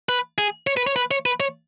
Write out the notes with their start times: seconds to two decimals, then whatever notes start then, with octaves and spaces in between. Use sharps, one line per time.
0.09 B4
0.38 G#4
0.67 C#5
0.77 B4
0.87 C#5
0.96 B4
1.11 C#5
1.26 B4
1.40 C#5